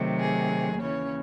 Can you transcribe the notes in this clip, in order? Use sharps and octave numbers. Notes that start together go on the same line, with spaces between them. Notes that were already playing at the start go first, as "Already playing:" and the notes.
Already playing: C3 D#3 F#3 A3
G#4
D#2 C#3 E3 C#4 C#5